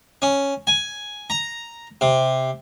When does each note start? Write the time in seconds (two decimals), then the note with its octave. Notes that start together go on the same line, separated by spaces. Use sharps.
0.22 C#4
0.67 G#5
1.30 A#5
2.01 C3